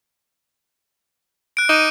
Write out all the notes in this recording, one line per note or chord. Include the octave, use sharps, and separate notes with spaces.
F#6 D7
D#4 D6 D#7